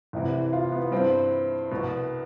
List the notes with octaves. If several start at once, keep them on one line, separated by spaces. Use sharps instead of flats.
C2 C3 E3
F4
B3
G2 E3 C4
C2 B2